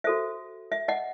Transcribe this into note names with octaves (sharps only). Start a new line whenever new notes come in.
F#4 A4 C5 E5
E5
D#5 F#5